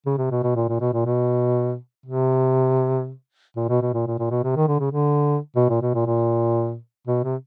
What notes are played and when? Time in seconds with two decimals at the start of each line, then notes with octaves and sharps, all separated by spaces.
0.06 C#3
0.18 C3
0.31 B2
0.43 B2
0.55 A#2
0.69 A#2
0.81 B2
0.93 A#2
1.05 B2
2.06 C3
3.56 A#2
3.69 B2
3.82 B2
3.94 A#2
4.06 A#2
4.19 A#2
4.31 B2
4.44 C3
4.56 D#3
4.68 D3
4.80 C#3
4.92 D3
5.56 B2
5.69 A#2
5.82 B2
5.94 A#2
6.06 A#2
7.07 B2
7.24 C3